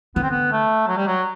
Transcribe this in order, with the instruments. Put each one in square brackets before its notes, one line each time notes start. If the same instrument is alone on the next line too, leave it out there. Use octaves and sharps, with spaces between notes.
[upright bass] D3 [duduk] B3
[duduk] C4
B3
A3
F#3
G3
F#3